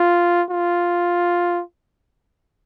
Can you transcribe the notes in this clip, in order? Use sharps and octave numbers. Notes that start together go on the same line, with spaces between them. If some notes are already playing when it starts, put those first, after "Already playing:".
Already playing: F4
F4